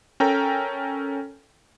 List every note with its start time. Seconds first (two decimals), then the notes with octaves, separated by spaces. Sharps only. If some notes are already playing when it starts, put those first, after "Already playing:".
0.20 C#4 A4 A#4 G5 A#5